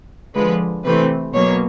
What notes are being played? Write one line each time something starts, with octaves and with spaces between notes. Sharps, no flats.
D3 F3 G#3 B4
C3 E3 A3 C4 B4
B2 F#3 A#3 C#5